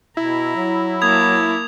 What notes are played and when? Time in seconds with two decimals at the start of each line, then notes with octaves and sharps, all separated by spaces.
0.17 B2 E4 A#5
0.56 F#3
1.02 A#3 A5 D#6 G#6 F7